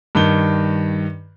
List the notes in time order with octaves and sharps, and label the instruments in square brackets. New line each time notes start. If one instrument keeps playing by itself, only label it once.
[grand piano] G2 D#3 G7